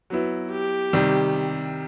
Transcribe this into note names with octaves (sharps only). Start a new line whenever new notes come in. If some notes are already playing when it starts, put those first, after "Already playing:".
F#3 B3 E4
G4
C3 D#3 G3